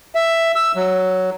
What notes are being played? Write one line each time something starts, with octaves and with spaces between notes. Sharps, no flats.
E5
E6
F#3